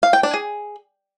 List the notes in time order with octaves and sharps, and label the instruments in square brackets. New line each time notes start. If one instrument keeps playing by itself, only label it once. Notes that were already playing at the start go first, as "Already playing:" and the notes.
[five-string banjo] F5
G5
D4
G#4